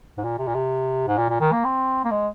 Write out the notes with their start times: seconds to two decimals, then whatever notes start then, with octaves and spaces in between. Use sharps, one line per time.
0.18 G#2
0.24 A#2
0.38 C3
0.47 A#2
0.55 C3
1.08 G#2
1.18 A#2
1.29 A#2
1.41 D#3
1.52 A#3
1.65 C4
2.05 A#3
2.11 G#3